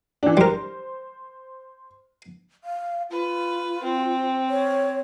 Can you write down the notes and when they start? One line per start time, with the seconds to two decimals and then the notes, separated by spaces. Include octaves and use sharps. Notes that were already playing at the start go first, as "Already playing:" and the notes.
0.23 E3 D4
0.37 G3 A#4 C5
2.64 F5
3.10 F4 B4
3.83 C4
4.49 C#5